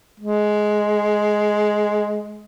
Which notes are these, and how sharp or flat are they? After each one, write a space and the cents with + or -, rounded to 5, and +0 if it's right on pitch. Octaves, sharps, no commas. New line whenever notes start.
G#3 +10